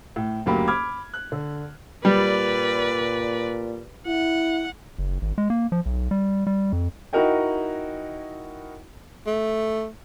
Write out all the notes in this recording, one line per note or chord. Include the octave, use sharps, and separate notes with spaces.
A2
F#1 D2 F#3 A#3 G4 B5
B5 D6 F6 G#6
F#6
D3
A#2 G3 B4 D5
E4 F#5
F#1
G#1
G#3
A#3
F3
B1
G3
G3
F2
D#4 E4 F#4 A#4 D#5 G5
A3